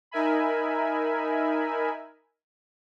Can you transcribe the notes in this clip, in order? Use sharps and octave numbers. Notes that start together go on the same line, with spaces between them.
D#4 A#4 E5 G#5 B5